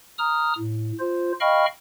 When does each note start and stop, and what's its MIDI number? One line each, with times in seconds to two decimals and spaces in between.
0.19 0.53 82
0.19 0.53 87
0.19 0.53 89
0.58 0.92 45
1.00 1.32 65
1.00 1.32 72
1.41 1.66 75
1.41 1.66 77
1.41 1.66 79
1.41 1.66 83
1.41 1.66 85
1.41 1.66 89